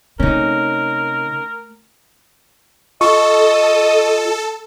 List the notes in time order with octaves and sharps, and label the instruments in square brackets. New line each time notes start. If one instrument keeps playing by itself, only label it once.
[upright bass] C3 [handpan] A3 [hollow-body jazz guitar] C#4 D#4 [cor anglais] A#4
[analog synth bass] F4 [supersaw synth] A4 [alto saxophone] D#5 [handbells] C#6